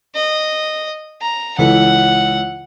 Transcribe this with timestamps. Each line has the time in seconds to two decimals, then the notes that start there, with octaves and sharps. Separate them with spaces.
0.15 D#5
1.21 A#5
1.58 C#2 E3 A4 F#5